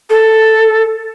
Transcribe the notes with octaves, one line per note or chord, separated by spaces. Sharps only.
A4